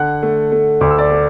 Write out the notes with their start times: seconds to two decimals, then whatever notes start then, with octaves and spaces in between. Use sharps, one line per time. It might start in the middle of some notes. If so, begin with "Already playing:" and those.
Already playing: D3 F#5 F#6
0.23 A3
0.52 A3
0.81 D2 D6
0.91 E6
0.98 D5 D6
1.11 A3